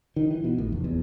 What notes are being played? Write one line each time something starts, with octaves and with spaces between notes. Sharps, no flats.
D#3
E3
B2
A1
F1
E2